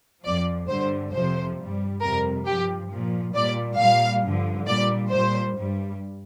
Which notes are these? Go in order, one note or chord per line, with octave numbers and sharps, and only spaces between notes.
F2 F3 D5
G2 D3 G3 C5
F2 C3 F3 C5
G2 G3
F2 C3 G3 A#4
G2 F3 G4
A#2 F3
A#2 G3 D5
A#2 G3 F5
G2 D3 F3
A#2 G3 D5
A#2 G3 C5
G2 G3